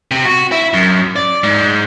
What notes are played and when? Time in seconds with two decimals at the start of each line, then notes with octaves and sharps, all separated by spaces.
0.11 C3
0.25 F#4
0.52 E4
0.74 F#2
1.16 D5
1.44 G#2